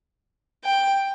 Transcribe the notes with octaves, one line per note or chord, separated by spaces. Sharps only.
G5